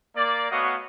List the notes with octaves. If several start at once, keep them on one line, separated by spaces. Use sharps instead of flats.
A#3 D5
A3 B3 F#4 C#5 D#5 F5